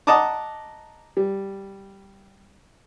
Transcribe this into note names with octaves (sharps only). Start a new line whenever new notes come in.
D#5 F#5 A5 A#5 D6 D#6
G3